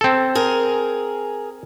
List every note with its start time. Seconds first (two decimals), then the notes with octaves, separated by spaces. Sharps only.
0.01 C4 A4
0.35 G#4 A#4